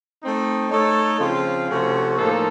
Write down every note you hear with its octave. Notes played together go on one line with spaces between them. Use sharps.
A3 C4 D#4
A3 D#4 A4 C#5
C#3 F3 C4 F4
C3 F3 A3 C#4 F#4
A2 F3 A#3 D#4 A4